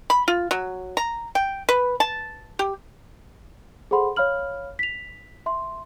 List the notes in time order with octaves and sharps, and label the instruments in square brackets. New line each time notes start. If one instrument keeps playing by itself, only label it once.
[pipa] B5
F4
F#3
A#5
G5
B4
A5
G4
[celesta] G#4 A4 C5 F#5 B5 C6
C#5 F5 B5 F6 F#7
B6 F7
E5 C6